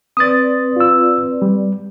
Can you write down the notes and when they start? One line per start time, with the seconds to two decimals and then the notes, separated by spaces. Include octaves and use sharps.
0.17 C4 B4 D5 D#6 A6
0.76 F4 E6
1.42 G3